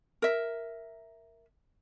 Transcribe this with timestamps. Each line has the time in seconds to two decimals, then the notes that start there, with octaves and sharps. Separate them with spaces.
0.22 A#4 E5